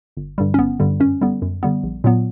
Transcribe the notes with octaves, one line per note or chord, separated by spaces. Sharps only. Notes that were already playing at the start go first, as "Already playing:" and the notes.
G1
G2 D3 G3
C#4
G1 B3
G2 D3 G3
F#2 C#4
D3 G3 B3
F#2
D3 G3 B3
A#1
A#2 F#3 B3